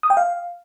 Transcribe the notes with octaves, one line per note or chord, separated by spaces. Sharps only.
D#6
G5
F5